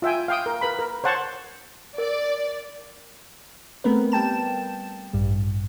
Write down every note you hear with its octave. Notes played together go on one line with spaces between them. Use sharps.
F4 E5 G5 G#5
F5 G5 D#6
A#4
A#4 B4 B5
A#4
C5 C#5 F#5 A5 C#6
A#4 D5
A3 B3 C4 A#4 B4
G3 G5 A5 E7
A1 G2 G3